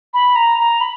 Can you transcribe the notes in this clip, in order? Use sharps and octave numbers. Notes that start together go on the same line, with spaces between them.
B5
A#5
A#5
B5